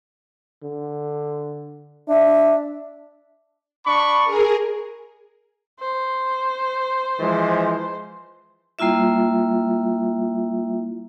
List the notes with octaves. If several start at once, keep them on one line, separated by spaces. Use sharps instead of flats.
D3
D4 E5
D4 B5 C#6
G#4 A#4
C5
E3 F3 G#3
G3 A#3 E4 F4 E5